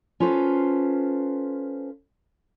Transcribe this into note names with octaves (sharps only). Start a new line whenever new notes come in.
C#4 F4 A4 B4 C5